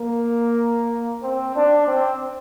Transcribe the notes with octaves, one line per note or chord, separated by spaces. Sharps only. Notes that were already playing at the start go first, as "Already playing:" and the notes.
Already playing: A#3
C4
D4
C4